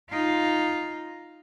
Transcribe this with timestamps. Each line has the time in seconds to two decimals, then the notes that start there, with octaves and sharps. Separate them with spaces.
0.10 D#4 F4